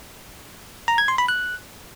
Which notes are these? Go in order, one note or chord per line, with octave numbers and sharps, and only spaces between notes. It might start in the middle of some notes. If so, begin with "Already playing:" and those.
A#5
G#6
C6
B5
F#6